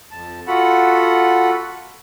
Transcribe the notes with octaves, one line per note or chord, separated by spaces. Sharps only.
F2 A5
F4 F#4 A4 F#5 B5